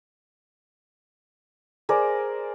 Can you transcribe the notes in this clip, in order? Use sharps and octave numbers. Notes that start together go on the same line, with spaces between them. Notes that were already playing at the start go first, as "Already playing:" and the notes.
G#4 A#4 C5 D5